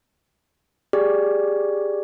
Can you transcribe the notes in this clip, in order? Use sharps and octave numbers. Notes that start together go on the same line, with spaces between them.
G4 G#4 D5